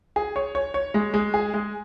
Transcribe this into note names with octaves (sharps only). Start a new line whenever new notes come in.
G#4
C#5
C#5
C#5
G#3
G#3
G#4
G#3